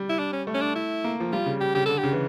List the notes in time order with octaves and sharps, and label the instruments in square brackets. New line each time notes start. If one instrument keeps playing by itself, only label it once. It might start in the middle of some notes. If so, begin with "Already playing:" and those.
Already playing: [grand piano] G3
[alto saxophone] E4
D4
C#4
[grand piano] A3
[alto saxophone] C#4
D4
E4
[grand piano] A#3
F3
[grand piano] G3 [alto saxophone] F4
[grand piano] C#3
[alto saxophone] G4
[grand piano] C#3 [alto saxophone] G4
[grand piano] D3 [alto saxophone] A4
[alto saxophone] G4
[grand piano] C#3
E3